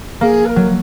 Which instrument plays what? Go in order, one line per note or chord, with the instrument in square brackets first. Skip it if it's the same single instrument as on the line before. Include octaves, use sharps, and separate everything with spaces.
[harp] A#3 [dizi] G#4
[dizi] B4
A#4
[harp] F#3